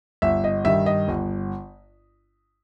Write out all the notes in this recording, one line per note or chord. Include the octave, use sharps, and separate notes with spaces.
G1 E5
D#5
G2 D#3 E5
D#5
G1